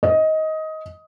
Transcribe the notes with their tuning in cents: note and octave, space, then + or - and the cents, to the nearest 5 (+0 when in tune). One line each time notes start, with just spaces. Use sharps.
D#5 +15